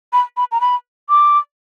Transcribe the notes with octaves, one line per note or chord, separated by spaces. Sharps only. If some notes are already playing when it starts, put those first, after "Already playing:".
B5
B5
A#5
B5
D6